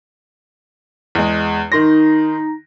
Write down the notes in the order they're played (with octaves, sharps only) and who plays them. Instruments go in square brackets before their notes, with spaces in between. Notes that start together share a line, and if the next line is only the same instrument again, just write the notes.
[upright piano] E2 G#3
[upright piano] D#3 C6 A#6 [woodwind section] D#4